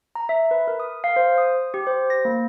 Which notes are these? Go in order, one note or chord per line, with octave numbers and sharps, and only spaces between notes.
A#5
E5
B4
A#4
D#6
F5
C5
D#6
G4
C5
A#6
A#3